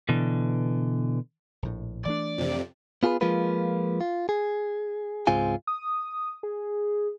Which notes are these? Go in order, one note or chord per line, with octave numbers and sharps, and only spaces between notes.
B2 D3 E3
A#1 A2
E3 A3 D4 D5
F2 C3
B3 F4 G#4 A#4 B4
F3 G#3 A#3 F4 B4
F4
G#4
C#2 G#2 G#3 C4 F4 G#5
D#6
G#4